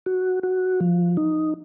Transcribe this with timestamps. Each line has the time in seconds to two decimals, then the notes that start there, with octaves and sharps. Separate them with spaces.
0.06 F#4
0.43 F#4
0.81 F3
1.17 D#4